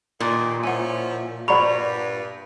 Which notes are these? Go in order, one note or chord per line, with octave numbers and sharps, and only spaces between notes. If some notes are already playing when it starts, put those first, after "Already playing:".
G2 A#2 D#3
F3 C#4 E4 F#5 G#5
G2 C5 D5 F#5 A#5 B5 C#6